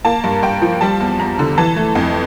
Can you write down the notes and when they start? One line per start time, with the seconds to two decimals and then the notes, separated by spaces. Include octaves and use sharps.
0.05 A#3 A5
0.24 G2
0.43 G2 G5
0.62 F3
0.81 G3 A5
1.00 E2
1.19 E2 A#5
1.39 D3
1.58 E3 A5
1.76 A3
1.95 F2